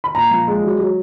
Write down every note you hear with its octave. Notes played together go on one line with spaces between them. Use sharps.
B5
A#2 A#5
F3
G#3
F#3
F#3